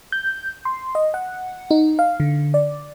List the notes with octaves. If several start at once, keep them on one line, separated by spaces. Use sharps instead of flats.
G6
C6
D#5
F#5
D#4
F5
D3
D5